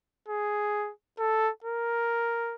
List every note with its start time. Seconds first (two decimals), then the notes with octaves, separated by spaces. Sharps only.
0.28 G#4
1.19 A4
1.64 A#4